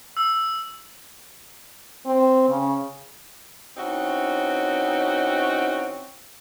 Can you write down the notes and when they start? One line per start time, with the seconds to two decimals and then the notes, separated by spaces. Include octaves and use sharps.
0.17 E6
2.06 C4
2.49 C#3
3.77 E3 C4 C#4 D#4 F#4